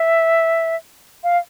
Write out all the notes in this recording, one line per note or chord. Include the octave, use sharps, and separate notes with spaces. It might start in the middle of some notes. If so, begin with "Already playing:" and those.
Already playing: E5
F5